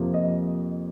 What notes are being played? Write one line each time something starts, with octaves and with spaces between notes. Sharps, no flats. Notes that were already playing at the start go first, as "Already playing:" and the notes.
Already playing: F2 C3 F3 A#3
D#5